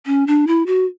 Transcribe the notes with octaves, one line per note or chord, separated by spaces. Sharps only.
C#4
D4
E4
F#4